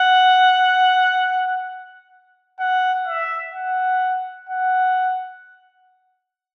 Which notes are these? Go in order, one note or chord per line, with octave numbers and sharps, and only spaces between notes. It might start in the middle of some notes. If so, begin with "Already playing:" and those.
Already playing: F#5
F#5
E5
F#5
F#5